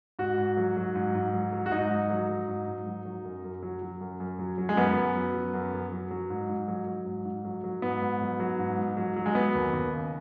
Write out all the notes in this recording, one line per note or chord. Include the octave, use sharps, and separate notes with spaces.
G#2 F#4
G#2
F#3
F#3
G#2
G#2
F#3
F#3
F#4
G#2 D#4
G#2
F#3
F#3
G#2
G#2
F#3
F#3
F#2
F#2
F#3
F#3
F#2
F#2
F#3
F#3
G#3
F#2 B3
F#2
F#3
F#3
F#2
F#2
F#3
F#3
G#2
G#2
F#3
F#3
G#2
G#2
F#3
F#3
G#2 B3
G#2
F#3
F#3
G#2
G#2
F#3
F#3
G#3
F#3 B3
D#2
D#2
C#3